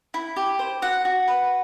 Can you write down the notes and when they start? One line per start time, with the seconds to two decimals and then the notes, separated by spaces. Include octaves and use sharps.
0.14 E4
0.36 G4
0.59 C5
0.82 F#4 F#5
1.05 F#4
1.28 B4